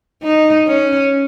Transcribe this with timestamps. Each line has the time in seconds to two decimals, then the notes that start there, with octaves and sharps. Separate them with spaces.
0.23 D#4
0.67 C#4